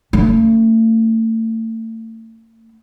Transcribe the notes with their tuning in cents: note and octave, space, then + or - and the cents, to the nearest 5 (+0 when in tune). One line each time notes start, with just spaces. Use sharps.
A3 +35 C#4 +20